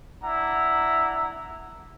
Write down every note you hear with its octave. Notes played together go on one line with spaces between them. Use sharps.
D4 E4 F#5 A#5